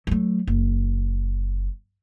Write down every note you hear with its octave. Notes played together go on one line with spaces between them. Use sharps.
F#3 A3
F#1